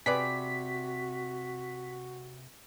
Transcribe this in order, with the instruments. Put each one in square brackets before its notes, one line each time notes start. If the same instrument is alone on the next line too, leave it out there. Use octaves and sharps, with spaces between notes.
[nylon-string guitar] C3 [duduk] F#4 [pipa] G#4 B4 D5 [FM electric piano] B6